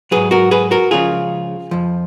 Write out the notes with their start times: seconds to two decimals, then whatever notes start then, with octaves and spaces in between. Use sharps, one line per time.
0.11 G#2 F#3 G#4 B4
0.31 F#4 A#4
0.51 G#4 B4
0.71 F#4 A#4
0.91 C#2 C#3 F3 F4 G#4
1.71 F2 F3